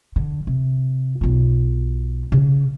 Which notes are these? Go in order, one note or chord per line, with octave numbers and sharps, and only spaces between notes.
D3
C3
B1 F4
C#3